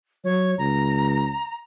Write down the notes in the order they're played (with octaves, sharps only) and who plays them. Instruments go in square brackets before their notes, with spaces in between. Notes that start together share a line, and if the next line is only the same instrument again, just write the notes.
[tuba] F#3 [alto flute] C#5
[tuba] C#2 [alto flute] A#5